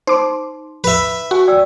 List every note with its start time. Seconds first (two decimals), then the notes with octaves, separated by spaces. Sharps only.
0.07 D#4 C5 C6 D6
0.84 B4 E5
1.31 F#4 G#5 C#6
1.48 D5 G5 E6